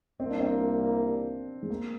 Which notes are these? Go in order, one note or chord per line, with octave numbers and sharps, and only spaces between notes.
C2 C3 G3 A#3 C4
D4
C4
G#3
A#3